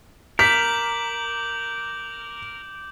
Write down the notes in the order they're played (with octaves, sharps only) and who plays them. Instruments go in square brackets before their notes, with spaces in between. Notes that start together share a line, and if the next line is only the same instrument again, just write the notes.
[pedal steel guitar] A#4 [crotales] D6 G6 F#7 [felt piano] B6